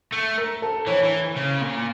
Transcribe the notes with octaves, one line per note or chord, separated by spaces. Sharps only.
A3
A#4
A4
E3 C#5
E3
C#3
A#2